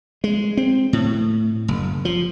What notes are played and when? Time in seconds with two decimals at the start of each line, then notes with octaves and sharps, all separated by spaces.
0.24 G#3
0.57 C4
0.93 A2
1.68 F#1
2.05 F3